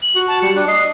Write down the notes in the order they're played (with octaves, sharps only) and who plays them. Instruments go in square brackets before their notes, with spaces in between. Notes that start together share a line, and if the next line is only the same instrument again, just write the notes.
[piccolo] F#7
[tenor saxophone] F#4
[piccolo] A5
[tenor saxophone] G3 [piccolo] C#7
[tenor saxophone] D4 [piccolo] F#6
[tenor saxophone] D#5 [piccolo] C7